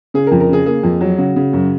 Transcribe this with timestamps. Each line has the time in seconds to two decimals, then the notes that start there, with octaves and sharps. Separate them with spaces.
0.14 C#3 G#4
0.27 A#4
0.31 F2
0.40 A#4
0.48 C#3 G#4
0.66 A#3 G#4
0.83 F2
1.01 F#3
1.18 C#3 F#4
1.36 C#3
1.53 F#2